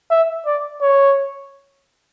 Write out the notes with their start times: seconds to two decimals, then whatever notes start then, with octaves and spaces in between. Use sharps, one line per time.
0.11 E5
0.46 D5
0.82 C#5